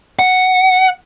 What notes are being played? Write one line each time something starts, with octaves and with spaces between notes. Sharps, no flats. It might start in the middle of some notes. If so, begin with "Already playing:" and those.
F#5